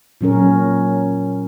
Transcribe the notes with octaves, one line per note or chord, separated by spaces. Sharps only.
A#2 F#3 C#4 A#4